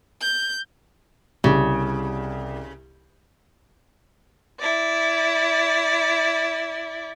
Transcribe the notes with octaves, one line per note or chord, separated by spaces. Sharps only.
G6
C2 C#3 G4
E4 D5